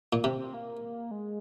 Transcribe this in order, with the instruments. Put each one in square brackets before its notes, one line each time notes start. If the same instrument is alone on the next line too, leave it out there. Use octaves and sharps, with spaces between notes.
[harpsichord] A#2
[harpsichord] C3 [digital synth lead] C4
[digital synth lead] C4
A#3
G#3